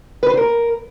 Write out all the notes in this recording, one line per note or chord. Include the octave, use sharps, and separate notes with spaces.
B4
C5
A#4